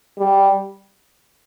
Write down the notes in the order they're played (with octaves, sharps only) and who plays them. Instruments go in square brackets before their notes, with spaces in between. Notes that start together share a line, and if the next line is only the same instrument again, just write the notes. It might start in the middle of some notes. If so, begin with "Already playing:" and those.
[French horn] G3